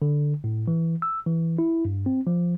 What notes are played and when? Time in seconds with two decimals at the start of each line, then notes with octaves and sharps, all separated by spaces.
0.02 D3
0.44 A2
0.68 E3
1.02 E6
1.26 E3
1.59 E4
1.85 G2
2.06 C4
2.27 F3